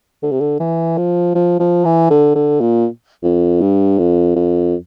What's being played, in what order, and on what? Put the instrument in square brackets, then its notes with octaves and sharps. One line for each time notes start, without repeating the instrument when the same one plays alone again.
[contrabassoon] D3
C3
D3
E3
F3
F3
F3
E3
D3
D3
A#2
F2
G2
F2
F2